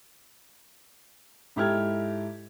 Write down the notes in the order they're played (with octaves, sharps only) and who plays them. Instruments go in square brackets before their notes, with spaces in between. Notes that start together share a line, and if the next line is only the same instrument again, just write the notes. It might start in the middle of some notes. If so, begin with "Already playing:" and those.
[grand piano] G#2 E4 G4 A4 F6 G#6